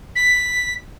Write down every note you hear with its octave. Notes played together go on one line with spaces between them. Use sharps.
B6